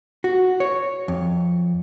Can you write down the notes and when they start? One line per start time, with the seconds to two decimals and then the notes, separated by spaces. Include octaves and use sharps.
0.24 F#4
0.60 C#5
1.08 F2